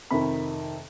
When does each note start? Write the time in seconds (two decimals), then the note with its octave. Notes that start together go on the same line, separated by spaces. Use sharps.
0.11 F2 C3 D#3 B5